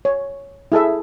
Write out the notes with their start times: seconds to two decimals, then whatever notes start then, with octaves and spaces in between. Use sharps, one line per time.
0.05 C#5
0.72 E4 G#4 A4 E5